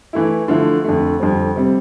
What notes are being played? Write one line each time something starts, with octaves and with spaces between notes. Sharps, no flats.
E3 A3 E4
D3 F3 A3 E4
F2 D3 A3
F2 D3 G3 C4
C3 G3 C4